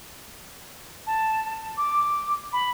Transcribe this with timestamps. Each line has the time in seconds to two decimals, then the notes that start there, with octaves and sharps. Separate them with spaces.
1.06 A5
1.44 A5
1.76 D6
2.52 B5